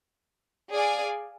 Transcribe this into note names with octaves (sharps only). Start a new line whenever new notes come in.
G#4 D5 F5 G#5